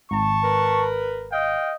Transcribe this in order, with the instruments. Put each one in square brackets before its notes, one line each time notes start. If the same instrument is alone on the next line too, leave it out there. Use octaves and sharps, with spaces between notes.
[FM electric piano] G#1 [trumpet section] A5 C#6
[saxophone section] A#4 B4
[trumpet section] D#5 F5 G5